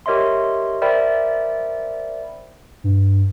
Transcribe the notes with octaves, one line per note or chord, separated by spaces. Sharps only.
G4 A#4 C#5 D#5 E5 C6
A#4 C5 D5 E5 G5 B5
G2